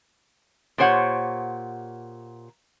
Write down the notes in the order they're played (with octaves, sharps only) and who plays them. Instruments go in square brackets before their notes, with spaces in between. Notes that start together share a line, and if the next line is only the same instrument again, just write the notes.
[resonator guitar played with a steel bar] A#2 G4 C5 C#5 F#5